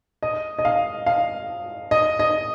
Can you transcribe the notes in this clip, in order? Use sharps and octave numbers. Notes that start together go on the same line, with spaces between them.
D#5
D#5
F5
F5
D#5
D#5